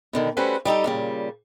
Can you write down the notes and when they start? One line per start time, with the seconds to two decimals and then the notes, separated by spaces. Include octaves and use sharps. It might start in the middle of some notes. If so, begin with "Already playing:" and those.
0.13 B2 D3 D#3
0.37 G3 A3 C#4 F#4 B4 C5
0.65 G3 D#4 G4 A4
0.84 A#2 C#3 G3